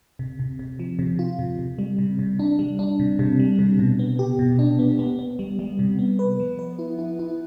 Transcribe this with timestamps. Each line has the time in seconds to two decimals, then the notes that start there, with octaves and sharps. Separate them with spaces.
0.19 C3
0.39 C3
0.59 C3
0.79 F3
0.99 C3
1.19 F4
1.39 C3
1.59 C3
1.79 G3
1.99 C3
2.19 C3
2.39 D4
2.59 G3
2.79 D4
2.99 C3
3.19 C3
3.40 G3
3.59 C3
3.79 B2
3.99 B3
4.19 G4
4.39 B2
4.59 D4
4.79 B3
4.99 B3
5.19 B3
5.39 G3
5.59 G3
5.79 C3
5.99 B3
6.19 B4
6.40 F3
6.59 B4
6.79 E4
6.99 E4
7.19 E4